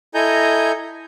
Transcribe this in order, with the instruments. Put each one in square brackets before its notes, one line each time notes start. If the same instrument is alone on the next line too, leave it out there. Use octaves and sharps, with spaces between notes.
[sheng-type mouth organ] E4 A4 D#5 G#5 A#5 G6